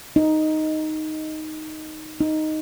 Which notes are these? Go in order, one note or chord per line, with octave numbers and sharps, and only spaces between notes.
D#4
D#4